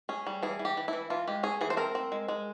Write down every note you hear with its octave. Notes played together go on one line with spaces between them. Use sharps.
C#4 G#4
G3
E3 G#4
E3
G4
E3
E3 E4
E3 F4
G#3 G4
C#4 G#4
E3 G#4
C5
C4 A#4
C4
G#3
G#3